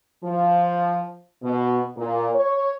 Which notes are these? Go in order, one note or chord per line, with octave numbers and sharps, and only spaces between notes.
F3
B2
A#2
C#5